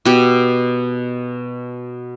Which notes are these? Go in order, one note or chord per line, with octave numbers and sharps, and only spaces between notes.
B2 G4